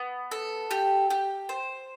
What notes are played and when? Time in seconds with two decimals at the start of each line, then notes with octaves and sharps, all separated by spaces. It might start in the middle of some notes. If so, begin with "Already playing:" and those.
Already playing: B3
0.31 A4
0.71 G4
1.10 G4
1.49 C5